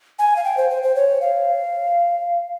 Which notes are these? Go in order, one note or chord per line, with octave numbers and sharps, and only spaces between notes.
G#5
F5
G5
C5
C5
C5
C#5
F5